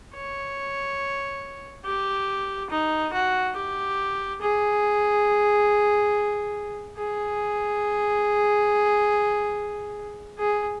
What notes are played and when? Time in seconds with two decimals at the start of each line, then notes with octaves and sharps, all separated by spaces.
0.14 C#5
1.85 G4
2.71 D#4
3.13 F#4
3.56 G4
4.42 G#4
6.97 G#4
10.39 G#4